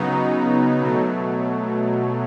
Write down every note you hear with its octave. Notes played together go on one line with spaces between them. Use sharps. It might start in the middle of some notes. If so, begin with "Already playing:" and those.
Already playing: C#3 F#3 B3 D#4
B2 F#3 A3